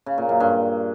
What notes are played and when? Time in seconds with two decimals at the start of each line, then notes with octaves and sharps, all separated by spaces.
0.06 C#3
0.18 A#2
0.29 F#2
0.40 G2